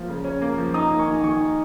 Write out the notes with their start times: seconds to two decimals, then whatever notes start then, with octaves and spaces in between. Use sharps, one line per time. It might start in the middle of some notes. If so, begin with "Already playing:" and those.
Already playing: F3 A#3 F5
0.08 C#3
0.25 C#4
0.42 A#3
0.58 F3
0.74 D#4 A#5 D#6
0.91 A#3
0.99 G#5 C#6
1.08 D#3
1.24 D#3 G#5 C#6
1.40 D#4